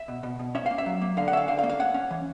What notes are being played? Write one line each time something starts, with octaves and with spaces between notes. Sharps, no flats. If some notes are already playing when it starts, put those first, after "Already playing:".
Already playing: E5
B2
B2
B2
C#4 E5
A#3 F5
E5
F#3
A#3
D3 F5
F#5
C#4 E5 F5
D3 F5
F5
A#3
F5
C#4 F#5
C#4
E3